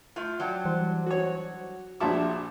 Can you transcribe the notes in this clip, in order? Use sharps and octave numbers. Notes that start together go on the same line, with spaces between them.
A3 F4
F#3 D4 G5
E3 G3 C5
F#4 C#5
A#1 C#4 D4 F#4 E5 A5 C6 D6